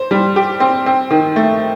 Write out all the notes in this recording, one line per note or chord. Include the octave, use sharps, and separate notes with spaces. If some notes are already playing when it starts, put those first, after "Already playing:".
Already playing: C5
G3
G4
C4
C4
D#3
A3